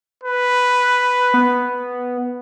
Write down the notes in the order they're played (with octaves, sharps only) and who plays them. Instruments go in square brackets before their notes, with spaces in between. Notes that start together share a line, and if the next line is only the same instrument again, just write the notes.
[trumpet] B4
[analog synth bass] B3